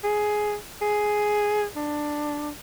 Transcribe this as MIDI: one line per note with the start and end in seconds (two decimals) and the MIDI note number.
0.04 0.56 68
0.81 1.65 68
1.76 2.50 62